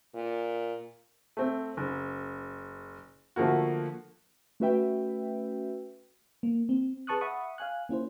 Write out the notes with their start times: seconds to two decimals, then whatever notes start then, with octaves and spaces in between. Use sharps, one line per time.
0.14 A#2
1.37 A3 C4
1.77 F#1
3.36 D3 F3 A3 A#3 F#4
4.60 A3 C#4 F#4 B4 E5 G5
6.43 A#3
6.69 C4
7.07 G#4 B4 A5 C#6 D#6 F#6
7.21 E5 F#5 B5 C#6 D#6
7.58 F5 G#5 F#6
7.89 A#3 C#4 E4 C5